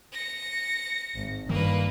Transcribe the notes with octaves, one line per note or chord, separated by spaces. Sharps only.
A#6 C#7
G#1
G2 D#3 F3 G#3 A#3 B4